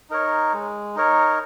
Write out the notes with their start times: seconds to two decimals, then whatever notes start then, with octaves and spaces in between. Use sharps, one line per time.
0.10 D#4 A#4 C#5
0.53 G#3
0.96 D#4 A#4 C#5